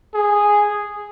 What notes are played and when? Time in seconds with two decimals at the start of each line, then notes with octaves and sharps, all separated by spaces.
0.14 G#4